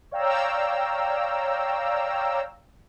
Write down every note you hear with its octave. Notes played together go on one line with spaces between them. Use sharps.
C#5 D5 F5 G5 A#5 E6